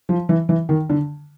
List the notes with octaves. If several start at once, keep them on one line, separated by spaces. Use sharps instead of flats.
F3
E3
E3
D#3
D3